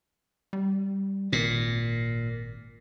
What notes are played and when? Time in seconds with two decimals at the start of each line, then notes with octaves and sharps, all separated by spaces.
0.53 G3
1.32 G#1 A#2